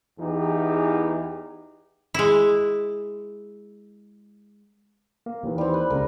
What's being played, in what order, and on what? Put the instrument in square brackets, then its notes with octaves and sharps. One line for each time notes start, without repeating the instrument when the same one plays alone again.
[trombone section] E2 E3 D#4 G4 G#4
[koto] G#3 E4
[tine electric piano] A#3
D#2 D#3 E3
[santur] G3 C4
B4
[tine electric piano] C#2 C#3 [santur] A#4